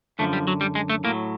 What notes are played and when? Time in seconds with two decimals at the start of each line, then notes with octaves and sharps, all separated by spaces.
0.19 F#2 D3 F3 A3
0.33 G3
0.47 F#3
0.61 G3
0.75 G#3
0.90 A3
1.04 A2 A#3
1.08 F#3